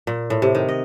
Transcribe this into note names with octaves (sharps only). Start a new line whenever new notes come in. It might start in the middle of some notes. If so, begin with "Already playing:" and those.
A#2
A2
C3
D#3
D#5